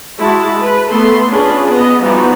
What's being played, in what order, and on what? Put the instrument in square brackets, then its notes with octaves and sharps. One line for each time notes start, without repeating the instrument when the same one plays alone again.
[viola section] G#3 E4 F#4 A5
B4
A3 B3 A4 C6
C#4 D4 F4 G#4 B4
B3 D#5
E3 F3 G3 B3 D#4 F#4